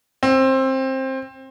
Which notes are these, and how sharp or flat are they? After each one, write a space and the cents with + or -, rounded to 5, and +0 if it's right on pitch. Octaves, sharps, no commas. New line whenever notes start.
C4 +20